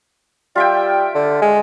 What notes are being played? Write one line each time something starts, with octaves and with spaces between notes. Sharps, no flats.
G3 F4 E5 G5
D3
G#3